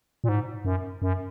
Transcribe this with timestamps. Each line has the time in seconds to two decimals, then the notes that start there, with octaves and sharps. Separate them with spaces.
0.24 A#2
0.29 G#2
0.65 F#2
1.02 F#2